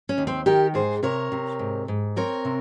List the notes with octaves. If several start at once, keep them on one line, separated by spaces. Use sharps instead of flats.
C#4
D#2
C4
D#3 G4 A#4
G#2 G#4 C5
C3 A#4 C#5
C3
G#2
G#2
C4 A#4 C#5
C3